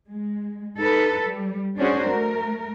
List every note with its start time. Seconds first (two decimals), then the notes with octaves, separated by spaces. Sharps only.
0.11 G#3
0.78 D#4 A4 B4
1.23 G3
1.77 C#4 D4 F#4 G#4 C5
2.07 A3 A#4